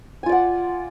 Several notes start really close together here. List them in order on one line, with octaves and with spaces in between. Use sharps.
G#5 F4 D5 F#5